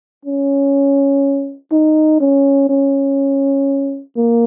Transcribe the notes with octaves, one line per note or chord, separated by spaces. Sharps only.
C#4
D#4
C#4
C#4
A#3